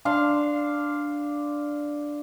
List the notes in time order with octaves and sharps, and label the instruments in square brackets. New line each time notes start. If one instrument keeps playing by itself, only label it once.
[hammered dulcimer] D4 F5 C6